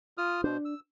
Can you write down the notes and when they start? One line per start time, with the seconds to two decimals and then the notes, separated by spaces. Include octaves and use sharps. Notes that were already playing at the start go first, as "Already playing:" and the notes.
0.18 F4 D#6 F6
0.44 B2 D4 C5
0.65 E6